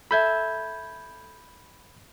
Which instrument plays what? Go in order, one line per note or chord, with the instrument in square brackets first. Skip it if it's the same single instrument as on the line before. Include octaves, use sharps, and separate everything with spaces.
[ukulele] A4 E5 [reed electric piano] B5 G6 G#6